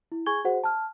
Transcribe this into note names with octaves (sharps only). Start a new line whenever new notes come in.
E4
G#4 G#5 C#6 G#6 G7
F#4 G#4 C5 F#5
A5 F6